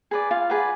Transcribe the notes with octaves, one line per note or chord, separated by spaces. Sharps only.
G#4 B4 D5
F4 F5
G#4 B4 D5 F#5